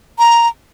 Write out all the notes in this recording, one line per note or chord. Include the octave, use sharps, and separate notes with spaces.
A#5